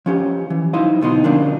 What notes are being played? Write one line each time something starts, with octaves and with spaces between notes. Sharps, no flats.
F3 C#4 G4
E3
F#3 D#4 E4 C5 D#5 F5
D2 B2 D#4 C6
D3 F3 A#3 C#4 D4